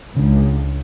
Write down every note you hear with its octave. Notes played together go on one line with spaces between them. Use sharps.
C#2 C#3 D4